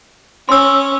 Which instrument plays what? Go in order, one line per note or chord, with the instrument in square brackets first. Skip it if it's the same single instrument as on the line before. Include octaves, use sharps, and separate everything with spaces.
[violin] C#4 [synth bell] C6 E6